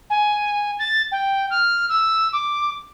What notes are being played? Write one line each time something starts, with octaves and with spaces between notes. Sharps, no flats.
G#5
A6
G5
F6
E6
D6